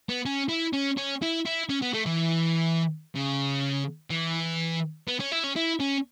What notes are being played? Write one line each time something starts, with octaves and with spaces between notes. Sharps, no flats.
B3
C#4
E4
C#4
C#4
E4
E4
C#4
B3
A3
E3
C#3
E3
B3
C#4
E4
C#4
E4
C#4